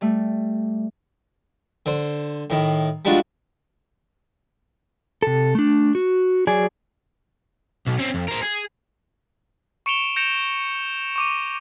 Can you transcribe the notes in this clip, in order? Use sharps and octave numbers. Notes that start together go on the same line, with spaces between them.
G3 A3
D3 C5
A2 D#3
G3 G#3 D4 F4 F#4
C3 A4
A3 D4
F#4
F#3 G#4 D5 G#5
B1
C4 C#4
F2
A#4 C5
G#4
C#6 C#7 D7 E7 F7 G7
G6 A#6 C#7 D7 E7 F7
C#6 D6 D#7